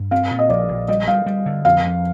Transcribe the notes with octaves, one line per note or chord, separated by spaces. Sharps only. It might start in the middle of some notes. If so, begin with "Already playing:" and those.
Already playing: G2
C4 F5
A#2
D#5
A#1 D5
A#1
G3 D#5
G3 F5
G3
D3
F2 F5
F2